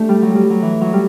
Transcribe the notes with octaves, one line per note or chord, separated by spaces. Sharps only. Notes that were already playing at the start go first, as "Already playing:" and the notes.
Already playing: A3 D4 G4
G3
F#3
G3
F#3
E3
F#3
G3